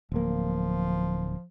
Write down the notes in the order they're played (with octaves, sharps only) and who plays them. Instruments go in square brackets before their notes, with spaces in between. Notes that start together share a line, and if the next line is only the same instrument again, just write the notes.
[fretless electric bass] D1 A#3 [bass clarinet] F3